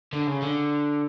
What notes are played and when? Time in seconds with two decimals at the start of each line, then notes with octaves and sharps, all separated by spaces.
0.13 D3
0.27 C#3
0.42 D3